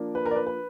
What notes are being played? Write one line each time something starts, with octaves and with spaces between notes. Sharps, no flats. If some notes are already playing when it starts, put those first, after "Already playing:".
Already playing: F3 A#3 D4
B4
A#4
D5
B4
B4